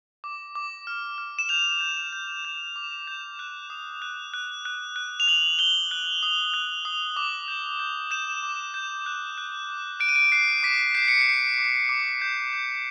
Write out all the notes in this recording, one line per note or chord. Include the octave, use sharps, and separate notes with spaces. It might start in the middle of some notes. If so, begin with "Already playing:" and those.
D6
D6
F6
F6
E7
G6 F7
G6
G6
G6
D6
G6
F#6
D#6
F#6
F#6
F#6
F#6
F7
F#6 F#7
F#6 G7
F#6
D#6
F#6
D#6
D6
G6
G6
G6 E7
D6
G6
F#6
F#6
D6
F#6 D7
D#7
D7
F#6 C7
D6 B6
G6 C7
C#7
C7
G6
D6
D6
G6
G6